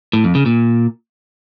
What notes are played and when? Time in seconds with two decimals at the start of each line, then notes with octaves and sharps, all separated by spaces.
0.13 A2
0.24 F2
0.35 C#3
0.46 A#2